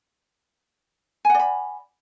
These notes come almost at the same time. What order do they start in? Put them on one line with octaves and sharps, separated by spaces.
G#5 F#5 D5 B5